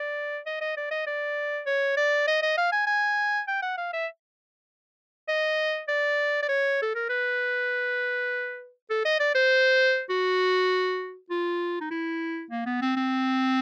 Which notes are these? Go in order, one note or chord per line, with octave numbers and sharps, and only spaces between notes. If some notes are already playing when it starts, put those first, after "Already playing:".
Already playing: D5
D#5
D#5
D5
D#5
D5
C#5
D5
D#5
D#5
F5
G#5
G#5
G5
F#5
F5
E5
D#5
D5
D5
C#5
A4
A#4
B4
A4
D#5
D5
C5
F#4
F4
D#4
E4
A#3
B3
C4
C4